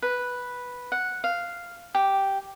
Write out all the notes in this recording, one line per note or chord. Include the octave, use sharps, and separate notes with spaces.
B4
F#5
F5
G4